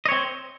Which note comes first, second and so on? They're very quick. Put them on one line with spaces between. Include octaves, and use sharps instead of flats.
D#5 C#5 C4